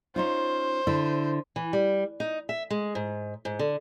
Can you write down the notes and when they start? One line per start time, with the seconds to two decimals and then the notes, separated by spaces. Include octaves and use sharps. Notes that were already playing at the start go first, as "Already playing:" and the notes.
0.16 C#4 D#4 F4 C5
0.87 D3 E4
1.56 E3
1.73 G3
2.20 D#4
2.49 E5
2.70 G#3
2.95 G#2
3.45 G#2
3.59 D3